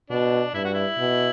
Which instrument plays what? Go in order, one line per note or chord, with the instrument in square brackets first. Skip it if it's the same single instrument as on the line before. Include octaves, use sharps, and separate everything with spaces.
[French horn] B2 [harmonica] D4
[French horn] G2 [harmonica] E4
[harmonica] F#4
E4
[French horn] B2